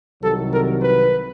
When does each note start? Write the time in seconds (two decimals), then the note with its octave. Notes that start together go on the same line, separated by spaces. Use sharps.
0.21 C2 C3 D#3 F#3 A4
0.50 A#4
0.79 B4